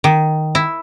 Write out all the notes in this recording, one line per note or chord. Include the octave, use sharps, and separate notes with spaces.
D#3
E4